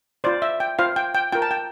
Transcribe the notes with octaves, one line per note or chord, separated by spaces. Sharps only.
F4 C5 D5
E5
G5
F4 C5 F5
G5
G5
F4 A#4 G5
A5
G5